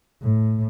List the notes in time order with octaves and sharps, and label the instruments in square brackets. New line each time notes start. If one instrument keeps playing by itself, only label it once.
[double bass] A2